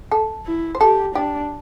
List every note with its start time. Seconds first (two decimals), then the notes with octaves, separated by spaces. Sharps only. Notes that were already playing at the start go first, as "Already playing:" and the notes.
0.11 A4
0.46 E4
0.75 C5
0.81 G4 A4
1.15 D4 G4